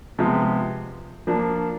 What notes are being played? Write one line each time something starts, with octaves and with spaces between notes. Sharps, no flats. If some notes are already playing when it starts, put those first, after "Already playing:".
C3 F3 G#3 B3
F3 A#3 D4